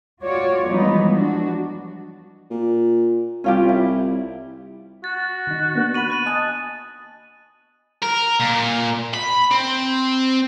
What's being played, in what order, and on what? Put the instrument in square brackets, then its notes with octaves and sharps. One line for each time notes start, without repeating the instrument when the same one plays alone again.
[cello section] F4 F#4 C#5 D5
E3 F3 G3 G#3 B3 D#4
D4 F#4
[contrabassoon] A#2
[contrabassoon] C2 [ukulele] C#4 F4 G4
[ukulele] E4
[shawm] F#4 [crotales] A6
[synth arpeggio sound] D#3 D#4
A#3 B3 D4
[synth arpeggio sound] B5 C#6 [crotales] D#7 F#7
[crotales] F#6 D#7 F#7
[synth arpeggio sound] D#5 G#5 D#6 [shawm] A5
[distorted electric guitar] A#4
A#2
B5
C4